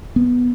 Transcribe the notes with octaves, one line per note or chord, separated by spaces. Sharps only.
B3